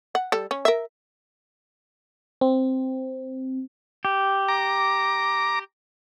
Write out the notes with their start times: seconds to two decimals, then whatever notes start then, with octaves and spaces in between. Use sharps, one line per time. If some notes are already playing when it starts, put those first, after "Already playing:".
0.15 F#5
0.32 G3 A4
0.51 C#4
0.65 A#4 E5
2.41 C4
4.05 G4
4.48 A#5 D6